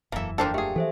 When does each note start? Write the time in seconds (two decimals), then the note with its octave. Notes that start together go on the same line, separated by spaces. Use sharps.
0.12 E1 F#2 E3 A#3 A4 E5
0.38 F3 A#3 D4 A4 C5 G5
0.54 A3 G4 G#4
0.76 E3 F3 A4 C5 E5